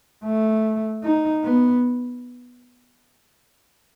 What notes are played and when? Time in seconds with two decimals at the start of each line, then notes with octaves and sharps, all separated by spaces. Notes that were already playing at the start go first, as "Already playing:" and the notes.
0.24 A3
1.03 D#4
1.44 B3